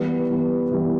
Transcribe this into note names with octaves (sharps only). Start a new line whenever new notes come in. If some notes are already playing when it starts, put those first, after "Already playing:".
Already playing: E3 G3 B3
E3 G3 B3
E3 G3 B3